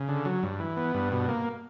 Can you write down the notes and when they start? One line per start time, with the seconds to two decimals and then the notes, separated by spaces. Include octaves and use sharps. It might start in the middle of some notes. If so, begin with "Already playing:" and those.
Already playing: C#3
0.09 D3
0.25 F#3
0.43 G2
0.60 E3
0.77 B3
0.94 G2
1.12 B2
1.29 A#3